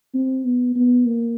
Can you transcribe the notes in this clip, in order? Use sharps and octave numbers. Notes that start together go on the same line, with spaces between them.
C4
B3
B3
A#3